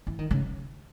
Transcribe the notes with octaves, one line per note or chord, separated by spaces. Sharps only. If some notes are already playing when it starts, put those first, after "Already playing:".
E3
D#3
C#3